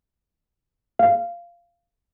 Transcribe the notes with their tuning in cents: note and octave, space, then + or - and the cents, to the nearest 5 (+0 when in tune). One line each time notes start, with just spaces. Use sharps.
F5 -15